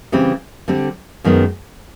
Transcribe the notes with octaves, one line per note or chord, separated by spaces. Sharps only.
C#3 E3 G3 C4
D3 G3 C4
F#2 D#3 G#3 B3